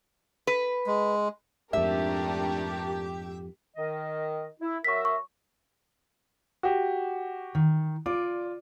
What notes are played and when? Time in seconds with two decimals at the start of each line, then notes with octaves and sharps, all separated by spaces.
0.47 B4
0.87 G#3
1.73 F2 G#2 A3 D4 G4 A#4 E5
3.76 D#3 D#5
4.60 E4
4.84 F#3 A#4 E5 C#6 B6
5.05 C#6
6.63 F#4 G4
7.55 D#3
8.06 F4 D5 D6